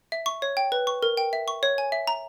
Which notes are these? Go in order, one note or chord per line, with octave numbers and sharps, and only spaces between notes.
E5
C#6
C#5
G5
B4
C#6
A#4
G5
E5
C#6
C#5
G#5
E5
A#5